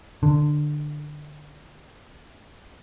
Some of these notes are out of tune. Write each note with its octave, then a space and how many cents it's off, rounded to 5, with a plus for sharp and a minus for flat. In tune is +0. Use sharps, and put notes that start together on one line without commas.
D3 +15